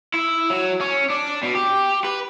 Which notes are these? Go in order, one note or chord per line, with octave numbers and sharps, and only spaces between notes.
E4
F#3
C#4
D4
B2
G4
B4